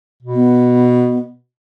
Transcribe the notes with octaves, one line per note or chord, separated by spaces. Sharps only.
B2
B3